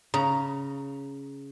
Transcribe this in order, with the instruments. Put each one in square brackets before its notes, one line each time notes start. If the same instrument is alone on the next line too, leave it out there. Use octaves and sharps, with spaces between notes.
[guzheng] C#3 [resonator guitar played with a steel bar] A#5